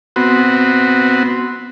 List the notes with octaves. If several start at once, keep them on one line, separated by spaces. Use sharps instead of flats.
B3 C4 F#4